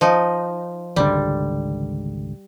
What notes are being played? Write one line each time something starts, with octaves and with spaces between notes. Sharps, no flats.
F3 D#4
G#1 C#2 D3 G3